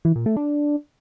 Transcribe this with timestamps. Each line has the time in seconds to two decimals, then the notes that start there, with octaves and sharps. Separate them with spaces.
0.05 E3
0.15 A#2
0.26 A3
0.36 D4